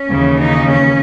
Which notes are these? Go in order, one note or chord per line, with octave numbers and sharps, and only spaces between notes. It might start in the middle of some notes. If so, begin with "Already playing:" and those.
Already playing: C#4
D#2 C#3 E3 A#3
D#4
C#4